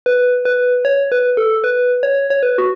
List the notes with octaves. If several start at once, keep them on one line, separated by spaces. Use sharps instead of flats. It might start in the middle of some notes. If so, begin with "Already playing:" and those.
B4
B4
C#5
B4
A4
B4
C#5
C#5
B4
F#4